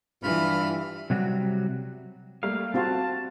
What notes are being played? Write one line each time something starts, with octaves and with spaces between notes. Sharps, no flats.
G2 E3 F4 B5 F6
C3 F#3 G3 F#4
G3 A3 A#3 F5
C4 F4 F#4 A5